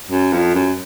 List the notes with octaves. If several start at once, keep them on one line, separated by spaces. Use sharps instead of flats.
F#2
F2
F#2